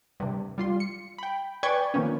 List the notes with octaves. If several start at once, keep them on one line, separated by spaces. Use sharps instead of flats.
G2 C3
G3 F4 C6
C#7
G5 B5
B4 D5 G5 G#5 C#6 G#6
D#3 F3 A#3 B3 C#4